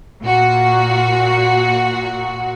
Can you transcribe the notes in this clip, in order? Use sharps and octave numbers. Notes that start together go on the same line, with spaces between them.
A#2 F#4